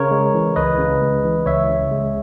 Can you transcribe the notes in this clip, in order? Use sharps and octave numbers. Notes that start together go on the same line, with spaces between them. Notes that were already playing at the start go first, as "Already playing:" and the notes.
Already playing: C#3 A#4 C#5
G#3
E3
C#2 B4 D#5
C#3
G#3
E3
C#2 C#5 E5
C#3
G#3